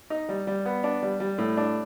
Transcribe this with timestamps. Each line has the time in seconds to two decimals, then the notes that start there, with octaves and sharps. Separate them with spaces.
0.10 D#4
0.29 G3
0.47 G3
0.65 B3
0.84 D4
1.03 G3
1.20 G3
1.38 A2
1.57 D4